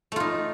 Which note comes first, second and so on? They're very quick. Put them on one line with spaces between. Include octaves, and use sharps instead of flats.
A3 F4 D#4